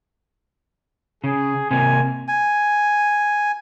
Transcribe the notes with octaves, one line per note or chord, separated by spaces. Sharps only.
C#3 G#4
C3 A#3 G#5
G#5